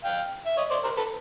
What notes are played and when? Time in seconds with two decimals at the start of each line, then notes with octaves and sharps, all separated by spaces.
0.05 F5 G5
0.46 E5
0.57 C#5 D#5
0.71 C5 D5
0.84 A#4 C5
0.97 A4 B4